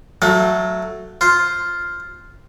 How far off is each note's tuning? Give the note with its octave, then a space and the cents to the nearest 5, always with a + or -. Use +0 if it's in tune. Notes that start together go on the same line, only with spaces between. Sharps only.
F#3 +0 A3 +0 F5 +40
F4 +0 C5 +0